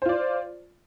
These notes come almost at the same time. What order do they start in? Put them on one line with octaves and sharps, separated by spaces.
C5 F4 D5